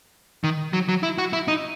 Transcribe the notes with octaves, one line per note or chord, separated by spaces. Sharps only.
D#3
F#3
F#3
E4
F#4
E4
D#4